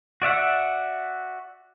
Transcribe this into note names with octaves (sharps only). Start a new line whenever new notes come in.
F#4 D5 E5 F#5